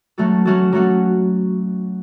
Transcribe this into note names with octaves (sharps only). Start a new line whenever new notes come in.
F#3 A3 C#4 F#4 A4
F#3 A3 C#4 F#4 A4
F#3 A3 C#4 F#4 A4